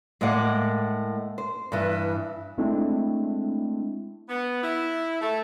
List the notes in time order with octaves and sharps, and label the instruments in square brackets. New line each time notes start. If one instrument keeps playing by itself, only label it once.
[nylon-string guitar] A2 G#3 A#3 D5 F#5
C5
G2 E3
[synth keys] G#3 A3 C4 D4 E4
[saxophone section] B3
E4
A3